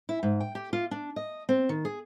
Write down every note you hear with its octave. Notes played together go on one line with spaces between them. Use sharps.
E4
G#2
G5
G4
F4
D4
D#5
C4
D#3
G#4